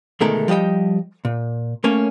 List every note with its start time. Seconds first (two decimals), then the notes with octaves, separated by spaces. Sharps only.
0.21 D2 B2 D#3 G#3 A3 A#4
0.48 F3 G3 G4 D#5 G5
1.25 A#2
1.84 A3 A#3 C#4 C#5